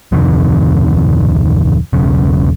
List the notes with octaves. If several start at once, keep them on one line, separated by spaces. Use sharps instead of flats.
D1 F2 C3 D#3
E1 B1 C#3